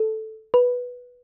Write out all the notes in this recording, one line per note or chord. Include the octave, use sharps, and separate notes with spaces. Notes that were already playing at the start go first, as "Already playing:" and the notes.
Already playing: A4
B4